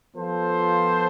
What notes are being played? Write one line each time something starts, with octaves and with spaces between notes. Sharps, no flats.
F3 B3 F4 A4 C5